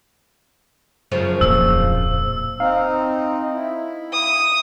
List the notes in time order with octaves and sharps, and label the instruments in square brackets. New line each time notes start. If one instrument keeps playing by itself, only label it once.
[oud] F#2 C#3 F3
[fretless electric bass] D1 F2 A#2 [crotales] E6
[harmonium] C4 D#4 [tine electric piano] F5
[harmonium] E4
[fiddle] D#6